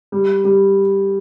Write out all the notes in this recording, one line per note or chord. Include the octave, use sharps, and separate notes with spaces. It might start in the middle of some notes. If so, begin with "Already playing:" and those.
G3
G3